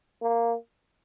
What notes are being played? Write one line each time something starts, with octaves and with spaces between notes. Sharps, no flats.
A#3